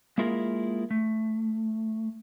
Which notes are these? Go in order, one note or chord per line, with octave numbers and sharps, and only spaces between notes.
G#3 A#3 E4 F4 G#4 A#4
A3